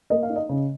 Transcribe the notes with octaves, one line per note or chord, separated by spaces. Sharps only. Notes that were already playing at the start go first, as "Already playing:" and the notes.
A#3 D#5
F5
D#4
D#5
C#3